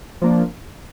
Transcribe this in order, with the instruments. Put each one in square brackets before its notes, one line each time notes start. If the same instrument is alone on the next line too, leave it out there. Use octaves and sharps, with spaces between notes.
[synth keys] F3 A#3 D4